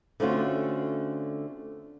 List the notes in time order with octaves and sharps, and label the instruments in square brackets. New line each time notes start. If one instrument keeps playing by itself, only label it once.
[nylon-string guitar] D3 A3 C4 C#4 F4 F#4